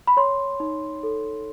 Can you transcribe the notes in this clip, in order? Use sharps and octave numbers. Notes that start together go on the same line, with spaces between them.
B5
C#5 C6
D#4
A4